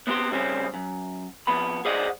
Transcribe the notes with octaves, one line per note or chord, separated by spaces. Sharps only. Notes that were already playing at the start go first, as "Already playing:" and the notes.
B3 C4 E4 G4 C5
C#3 G3 C4 C#4
F#2
F2 B3 B5
G#4 C5 D5 D#5 F#5